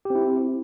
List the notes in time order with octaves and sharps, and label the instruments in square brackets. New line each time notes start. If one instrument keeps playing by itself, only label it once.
[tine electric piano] G4
C4
E4